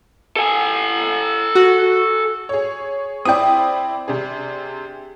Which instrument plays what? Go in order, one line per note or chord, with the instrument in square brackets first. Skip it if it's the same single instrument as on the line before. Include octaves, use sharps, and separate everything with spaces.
[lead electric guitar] A4 G#5
[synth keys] F#4
[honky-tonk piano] G#4 C#5
[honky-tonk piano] C4 E4 D5 [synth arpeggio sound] G5 D#6
[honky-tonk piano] C3 D4 G#4